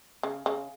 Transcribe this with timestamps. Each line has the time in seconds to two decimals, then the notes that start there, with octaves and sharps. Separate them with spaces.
0.23 C#3
0.46 C#3